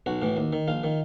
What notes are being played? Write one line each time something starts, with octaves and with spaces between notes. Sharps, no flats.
B1 F#4
A2 E3
D#2
D#3
A#1 F4
D#3